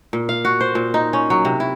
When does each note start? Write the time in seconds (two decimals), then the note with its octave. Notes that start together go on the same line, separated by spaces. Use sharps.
0.13 A#2
0.29 F5
0.45 F#4
0.61 C5
0.75 A#2
0.94 D#4
1.13 C#4
1.30 F#3
1.45 C3
1.60 E4